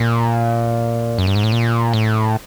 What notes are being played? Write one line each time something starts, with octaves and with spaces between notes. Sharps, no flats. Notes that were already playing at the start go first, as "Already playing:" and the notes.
Already playing: A#2
F#2
G2
G#2
A2
A#2
A2